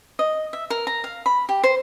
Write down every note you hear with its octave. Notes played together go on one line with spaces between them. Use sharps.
D#5
E5
A#4
A#5
F5
B5
G4
C5